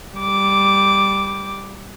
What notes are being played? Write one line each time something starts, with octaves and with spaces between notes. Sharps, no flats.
G3 D6